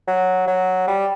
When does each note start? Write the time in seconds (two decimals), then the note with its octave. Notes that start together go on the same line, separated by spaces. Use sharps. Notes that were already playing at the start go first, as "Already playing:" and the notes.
0.07 F#3
0.47 F#3
0.88 G3